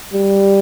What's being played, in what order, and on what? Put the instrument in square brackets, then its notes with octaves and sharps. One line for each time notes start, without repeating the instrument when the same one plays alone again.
[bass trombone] G3